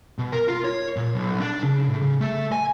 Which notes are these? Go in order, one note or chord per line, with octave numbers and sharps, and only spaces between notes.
B2
A#4
F4
C#5
A#2
B1
D4
C#3
A2
C#3
A3
G#5